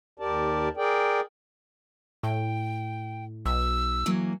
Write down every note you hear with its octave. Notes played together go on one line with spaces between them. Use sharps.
D#2 G4 A#4 D5 A5
G#4 A#4 D5 G5
A2 G5
B1 E6
E3 F#3 A#3